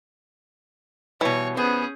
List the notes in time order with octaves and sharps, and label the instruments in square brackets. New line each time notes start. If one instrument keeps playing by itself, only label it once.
[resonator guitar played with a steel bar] B2 G3 [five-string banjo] E3 [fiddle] C#5
[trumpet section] B3 [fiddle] C#4 G#4 [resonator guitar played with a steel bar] C5